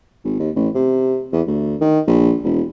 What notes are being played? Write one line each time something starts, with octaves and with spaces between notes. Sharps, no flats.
G#1
D#2
A1
C3
E2
D2
D#3
A#1
E1